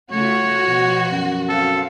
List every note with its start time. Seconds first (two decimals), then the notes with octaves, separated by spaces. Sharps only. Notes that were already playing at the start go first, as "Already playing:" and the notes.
0.13 C#3 A3 F4 F#4 C#5
0.63 B2 F3
1.12 F#2
1.49 C4 A4 F5